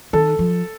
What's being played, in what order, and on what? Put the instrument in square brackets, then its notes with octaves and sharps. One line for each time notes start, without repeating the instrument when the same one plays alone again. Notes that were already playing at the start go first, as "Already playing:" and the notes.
[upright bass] D#3 [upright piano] A4
[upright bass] F3